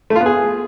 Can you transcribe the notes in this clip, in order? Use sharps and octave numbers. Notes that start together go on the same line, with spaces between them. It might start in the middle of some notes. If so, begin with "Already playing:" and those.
A3
F4
B3
G#4